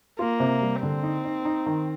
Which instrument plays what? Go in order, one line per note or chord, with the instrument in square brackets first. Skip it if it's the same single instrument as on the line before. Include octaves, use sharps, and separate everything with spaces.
[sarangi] A#3 [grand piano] F4
[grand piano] C3
G3
[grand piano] D3 [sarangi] C4
[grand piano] D#4
D#4
D#4
D#3